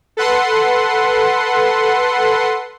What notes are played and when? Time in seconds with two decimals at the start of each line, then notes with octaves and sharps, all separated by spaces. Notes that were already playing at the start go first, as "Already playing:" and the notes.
0.17 A4 B4 F#5 C6